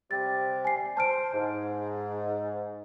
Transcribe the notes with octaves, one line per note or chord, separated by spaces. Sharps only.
C3 G3 G4 A6
G#5 C7
C5 A5 F6 D7
G#2